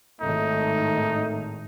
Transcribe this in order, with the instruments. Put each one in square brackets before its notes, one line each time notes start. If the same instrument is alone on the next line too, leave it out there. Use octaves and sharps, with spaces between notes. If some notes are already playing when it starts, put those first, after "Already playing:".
[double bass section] G#1 A2 D#3 [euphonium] A3 [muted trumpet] D#4